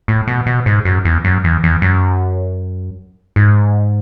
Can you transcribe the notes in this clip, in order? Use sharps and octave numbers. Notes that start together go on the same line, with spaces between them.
A2
B2
B2
G#2
F#2
E2
F#2
E2
E2
F#2
G#2